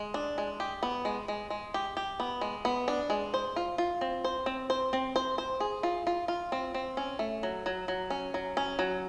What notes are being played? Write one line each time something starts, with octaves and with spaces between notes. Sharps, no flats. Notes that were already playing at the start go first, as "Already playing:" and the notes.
Already playing: G#3
D4
G#3
G4
B3
G#3
G#3
G#3
G4
G4
B3
G#3
B3
D4
G#3
C5
F4
F4
C4
C5
C4
C5
C4
C5
C5
G#4
F4
F4
F4
C4
C4
C#4
A3
F#3
F#3
F#3
C#4
F#3
C#4
F#3